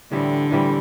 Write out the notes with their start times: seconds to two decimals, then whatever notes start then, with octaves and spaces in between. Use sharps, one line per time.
0.11 A2 D3 E3 G3 C4
0.51 A2 E3 G3 C4